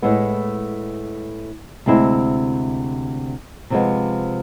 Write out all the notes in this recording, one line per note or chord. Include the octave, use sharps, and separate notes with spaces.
A2 G#3 B3 E4
D2 C3 G#3 C4 E4
C3 F3 G#3 B3